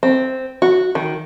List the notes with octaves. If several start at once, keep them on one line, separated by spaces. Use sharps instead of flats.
C4
F#4
D#3